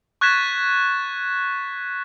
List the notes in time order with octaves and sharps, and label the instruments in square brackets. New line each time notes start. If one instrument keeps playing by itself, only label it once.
[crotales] C#6 F#6 G#6 A6 B6 E7